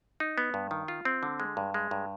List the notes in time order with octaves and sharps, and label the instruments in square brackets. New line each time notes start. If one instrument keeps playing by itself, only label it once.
[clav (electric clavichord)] D#4
B3
G2
D#3
F4
C4
D3
G#3
G2
G#3
G2